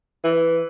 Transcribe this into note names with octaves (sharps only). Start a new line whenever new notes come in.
E3